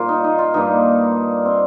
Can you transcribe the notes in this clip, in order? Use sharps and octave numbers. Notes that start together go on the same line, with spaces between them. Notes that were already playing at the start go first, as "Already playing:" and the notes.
Already playing: A#2 G3 A#3 F4 A#4 C5
D#4
D#4
F4
G2 G3 A#3 D#4
C4